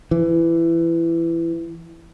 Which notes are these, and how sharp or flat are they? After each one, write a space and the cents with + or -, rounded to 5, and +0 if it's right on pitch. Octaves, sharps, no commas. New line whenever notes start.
E3 +20